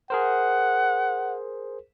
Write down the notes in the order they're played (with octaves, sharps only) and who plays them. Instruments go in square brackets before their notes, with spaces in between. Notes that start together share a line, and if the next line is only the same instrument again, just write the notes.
[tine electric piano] G#4 A#4 C5 [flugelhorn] F#5